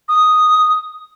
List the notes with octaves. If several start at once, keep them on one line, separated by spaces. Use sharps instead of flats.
D#6